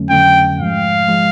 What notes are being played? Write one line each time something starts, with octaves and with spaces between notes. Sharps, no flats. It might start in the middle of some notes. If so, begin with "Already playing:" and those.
Already playing: F2 D3 F#3 A3 C#4
F2 D3 F#3 A3 C#4 G5
G#2 F3 G#3 F5
F3 G#3